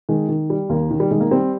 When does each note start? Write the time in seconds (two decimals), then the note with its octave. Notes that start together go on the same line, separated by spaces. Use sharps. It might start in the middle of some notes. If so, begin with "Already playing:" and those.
0.09 D#3 G#3
0.29 D#3
0.50 G3
0.70 D#2 A#3
0.91 D#3
1.00 G3
1.11 D#3 G#3
1.20 A#3
1.31 G3 C4